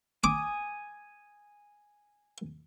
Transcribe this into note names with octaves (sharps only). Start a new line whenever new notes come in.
G#5 D6 D#6